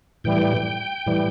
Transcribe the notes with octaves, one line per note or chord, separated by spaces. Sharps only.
A2 E3 G3 G5
A2 E3 G3